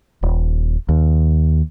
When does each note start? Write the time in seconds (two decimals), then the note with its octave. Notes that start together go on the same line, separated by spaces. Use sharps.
0.23 D#1
0.89 D#2